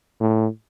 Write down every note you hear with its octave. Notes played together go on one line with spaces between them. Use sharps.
A2